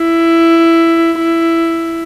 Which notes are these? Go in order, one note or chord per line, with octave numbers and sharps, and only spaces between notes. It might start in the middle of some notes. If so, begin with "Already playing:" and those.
Already playing: E4
E4